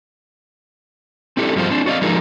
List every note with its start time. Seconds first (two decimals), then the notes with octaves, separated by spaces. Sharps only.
1.37 C4 D4 E4 G4 A4
1.56 G2 F3 G#3 F4 C5
1.70 C4 D4
1.86 F#4 D5 D#5 F5
2.02 F3 G#3 D#4 F#4 G#4 A#4